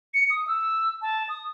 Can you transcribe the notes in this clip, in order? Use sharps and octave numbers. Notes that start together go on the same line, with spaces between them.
C#7
D#6
E6
A5
D#6